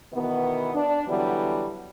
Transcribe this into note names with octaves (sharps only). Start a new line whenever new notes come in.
B2 D#3 E3 B3
D4
D3 E3 F#3 G3 B3